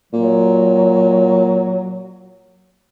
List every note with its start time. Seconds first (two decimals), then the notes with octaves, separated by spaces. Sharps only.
0.13 A#2 F#3